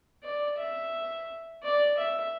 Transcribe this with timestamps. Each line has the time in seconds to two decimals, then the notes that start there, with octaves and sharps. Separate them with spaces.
0.23 D5
0.58 E5
1.63 D5
1.98 E5